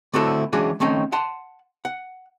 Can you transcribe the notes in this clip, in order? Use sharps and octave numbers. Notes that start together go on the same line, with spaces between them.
D3 A3 C4 E4 F#4 A4
E3 G#3 C#4 D4 F#4 G#4
D#3 A3 C4 C#4 D#4
F#5 A5 C6
F#5